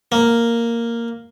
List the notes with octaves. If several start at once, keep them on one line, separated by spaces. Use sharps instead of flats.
A#3